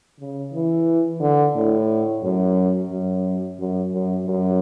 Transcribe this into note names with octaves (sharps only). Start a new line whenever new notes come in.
C#3
E3
D3
A2
F#2
F#2
F#2
F#2
F#2